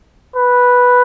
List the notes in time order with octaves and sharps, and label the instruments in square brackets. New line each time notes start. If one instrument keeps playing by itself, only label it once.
[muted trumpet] B4